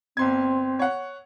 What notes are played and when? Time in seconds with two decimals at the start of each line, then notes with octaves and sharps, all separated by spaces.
0.17 G1 C4 C6 G#6
0.79 C#5 F#5